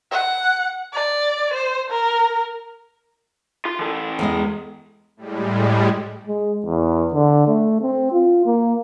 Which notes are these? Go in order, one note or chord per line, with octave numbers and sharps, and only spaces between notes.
F#5
D5
C5
A#4
F4 C6
E3 A4
E2 G#3 D#5
A2 G3 G#3
G#3
E2
D3
A3
C4
F4
A#3